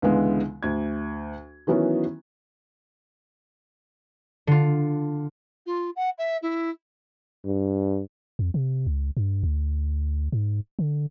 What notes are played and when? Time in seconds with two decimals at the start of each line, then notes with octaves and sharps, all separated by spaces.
0.02 C#2 D3 E3 G#3 B3
0.63 D2 G#6
1.67 D#3 E3 F#3 B3 C#4 E4
4.47 D3 F4
5.66 F4
5.96 F#5
6.18 E5
6.42 E4
7.45 G2
8.39 F2
8.54 C3
8.87 C#2
9.17 G2
9.43 D2
10.32 G#2
10.79 D3